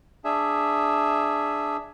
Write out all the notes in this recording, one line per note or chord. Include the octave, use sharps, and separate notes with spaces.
D4 G#4 E5